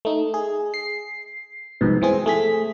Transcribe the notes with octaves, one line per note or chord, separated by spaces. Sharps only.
A3 D#4
G#4
C7
C2 F2 G#2 B2
E3 C4 G#4
A3 G#4 B6